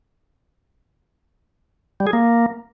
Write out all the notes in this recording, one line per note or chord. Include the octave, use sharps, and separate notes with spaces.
G3
G#4
A#3